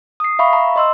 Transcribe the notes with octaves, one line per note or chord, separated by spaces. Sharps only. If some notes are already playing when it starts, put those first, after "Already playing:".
D#6 C7
E5 F5 B5 C#6
A#5
D#5 C6 E6